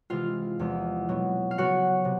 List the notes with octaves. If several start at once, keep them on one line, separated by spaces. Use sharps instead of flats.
C3 E3 G#3 F4 F5
E2 C3 F3 G#3
B2 F#3 B3
F5
C#3 F#3 B3 F#4 F#5
C3